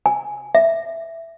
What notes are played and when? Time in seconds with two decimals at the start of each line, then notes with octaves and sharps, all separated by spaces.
0.06 G#5
0.55 E5